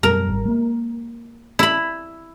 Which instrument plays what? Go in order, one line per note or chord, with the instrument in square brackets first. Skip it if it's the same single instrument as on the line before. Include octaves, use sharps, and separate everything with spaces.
[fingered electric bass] F#2 B2 G3 [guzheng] A#4
[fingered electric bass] G#1 G3
G#3 A#3
[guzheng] E4 B5